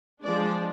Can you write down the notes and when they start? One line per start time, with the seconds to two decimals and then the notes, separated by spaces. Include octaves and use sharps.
0.22 F3 G#3 D4 D5